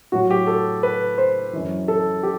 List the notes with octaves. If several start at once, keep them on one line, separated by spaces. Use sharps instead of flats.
A2 F#3 F#4
G4
A4
B4
C5
F#2 E3
A4
G4